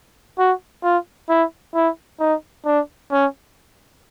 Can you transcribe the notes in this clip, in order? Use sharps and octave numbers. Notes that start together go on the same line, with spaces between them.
F#4
F4
E4
E4
D#4
D4
C#4